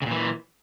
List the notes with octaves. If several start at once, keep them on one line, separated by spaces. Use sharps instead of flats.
A#2 C#3 E3